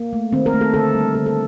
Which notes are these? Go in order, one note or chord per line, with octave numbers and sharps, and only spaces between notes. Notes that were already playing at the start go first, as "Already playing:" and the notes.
Already playing: A#3
A3
D#3 C4
A#4
A3
A4
D3 A4
G3 A#3
D3 A4
A4